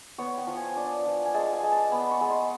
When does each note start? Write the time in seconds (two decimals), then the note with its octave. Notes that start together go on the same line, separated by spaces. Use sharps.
0.18 B3 C#5
0.38 G5
0.47 F3
0.57 G#5
0.76 D4
1.05 F3
1.26 G#5
1.34 G#3 A5
1.53 G#5
1.63 G#3
1.72 A5
1.92 B3 B5
2.11 C#6
2.21 G#3
2.31 C6